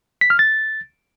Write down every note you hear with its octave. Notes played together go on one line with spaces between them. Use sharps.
B6
F6
A6